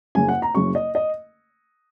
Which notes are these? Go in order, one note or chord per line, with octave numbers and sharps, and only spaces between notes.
F#1 F#2 C#3 G#5
F#5
A#5
F#1 F#2 C#3 C#6
D#5
D#5